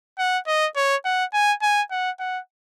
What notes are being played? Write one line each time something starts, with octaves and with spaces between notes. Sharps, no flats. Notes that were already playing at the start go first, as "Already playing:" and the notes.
F#5
D#5
C#5
F#5
G#5
G#5
F#5
F#5